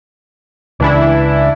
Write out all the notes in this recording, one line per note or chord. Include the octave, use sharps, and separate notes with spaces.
C#2 C#3 E3 G#3 D4 E4